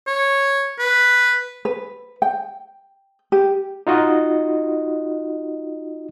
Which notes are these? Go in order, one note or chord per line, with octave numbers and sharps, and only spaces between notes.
C#5
B4
B4
G5
G4
D#4 F4 F#4 D#5